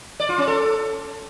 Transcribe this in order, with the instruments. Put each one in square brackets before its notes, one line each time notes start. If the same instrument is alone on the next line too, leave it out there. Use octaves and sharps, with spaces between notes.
[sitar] D5
F4
C#4
A4